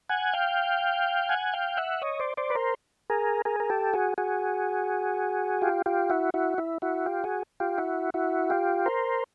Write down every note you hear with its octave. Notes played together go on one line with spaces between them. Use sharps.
F#5 G#5
F5 G5
F#5 G#5
F5 G5
E5 F#5
C#5 D#5
C5 D5
C5 D5
B4
A#4 C5
G#4 A#4
G#4 A#4
A#4
G4 A4
F#4 G#4
F#4 G#4
F4 G4
F4 G4
E4 F#4
E4 F#4
E4
E4 F#4
F4 G4
F#4 G#4
F4 G4
E4 F#4
E4 F#4
F4 G4
A#4 C5